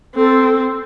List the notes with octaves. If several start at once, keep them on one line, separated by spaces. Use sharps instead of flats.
C4 A4